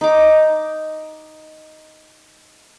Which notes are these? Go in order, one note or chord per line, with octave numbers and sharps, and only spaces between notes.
D#4 D6